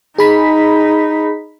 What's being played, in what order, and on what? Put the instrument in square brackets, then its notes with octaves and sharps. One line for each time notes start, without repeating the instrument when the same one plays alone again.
[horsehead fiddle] D#4 [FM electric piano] G#4 B5 B6